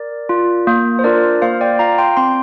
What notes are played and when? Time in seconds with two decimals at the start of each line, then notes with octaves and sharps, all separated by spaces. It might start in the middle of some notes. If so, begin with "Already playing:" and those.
Already playing: A#4 D5
0.29 F4
0.67 A#3
0.99 C5
1.04 D4 F4 A#4 D5
1.42 A#3 C5 F5
1.61 D5 G5
1.79 F4 F5 A#5
1.98 G5 C6
2.17 C4 G5 C6